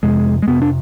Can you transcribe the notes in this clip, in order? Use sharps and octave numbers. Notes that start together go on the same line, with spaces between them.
F2 C3 G#3
G#3
F2 C3 B3
D4